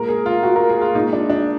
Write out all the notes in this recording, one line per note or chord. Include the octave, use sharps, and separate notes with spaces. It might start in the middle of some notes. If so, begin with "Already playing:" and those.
Already playing: A#2 G#3 A#4
G#4
F4
F#4
A#4
G#4
F4
A#2 G#3 D#4
D4
D4